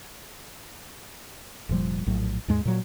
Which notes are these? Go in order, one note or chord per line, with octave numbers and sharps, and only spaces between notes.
F1 A#2 F3 G3
A#1 A2 F#3
D#2 G#2 G#3
A#2 F#3